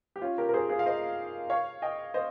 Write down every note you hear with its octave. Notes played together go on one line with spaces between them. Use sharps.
G4
C#4 F4
G4 A#4
A#4
G#4 C5
F4 G#4
F5
C5 D#5
C#5 F5
D#5 G5
C5 D#5